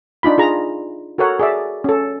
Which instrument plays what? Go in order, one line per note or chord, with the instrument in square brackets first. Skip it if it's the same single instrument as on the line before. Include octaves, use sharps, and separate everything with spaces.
[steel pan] D4 D#4 F4 B5
F4 G#4 A#5
F#4 A4 A#4 C#5 F#5
G#4 D5 E5
C#4 A4